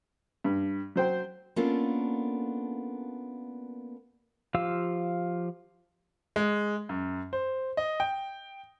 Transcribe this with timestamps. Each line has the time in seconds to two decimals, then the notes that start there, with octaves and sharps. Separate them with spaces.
0.44 G2
0.96 F#3 C5 G5
1.56 A#3 B3 C#4 D4 F4 A4
4.54 F3 F4 G4 F5 E6
6.36 G#3
6.89 F#2
7.33 C5
7.77 D#5
8.00 G5